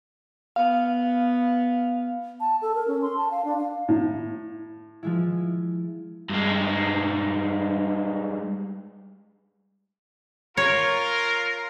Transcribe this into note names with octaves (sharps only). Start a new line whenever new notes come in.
B3 F5
A5
A4
A#4
C#4
C6
A5
F5
D4
F5
A2
F3 G#3 E4
G2 G#3
F4 A#4 C#5